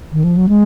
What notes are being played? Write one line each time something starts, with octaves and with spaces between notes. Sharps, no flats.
D#3
F3
F#3
G#3